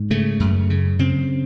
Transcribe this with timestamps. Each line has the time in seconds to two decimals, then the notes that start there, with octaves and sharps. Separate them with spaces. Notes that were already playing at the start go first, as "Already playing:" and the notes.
Already playing: G#2
0.10 C#3 A3
0.40 F#2
0.70 C#3
0.99 C#3 C4